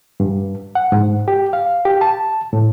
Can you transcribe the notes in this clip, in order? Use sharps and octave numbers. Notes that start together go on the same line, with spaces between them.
G2
F#5
G#2
G4
F5
G4
A5
A2